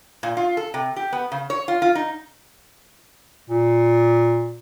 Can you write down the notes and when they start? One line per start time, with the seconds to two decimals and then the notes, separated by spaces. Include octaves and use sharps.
0.23 A#2
0.37 F4
0.57 A4
0.74 C3
0.96 G4
1.13 B3
1.32 C#3
1.50 C#5
1.68 F4
1.82 F4
1.95 D#4
3.50 A#2